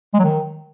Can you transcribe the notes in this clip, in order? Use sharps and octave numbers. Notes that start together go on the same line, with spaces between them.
G#3
F#3
D#3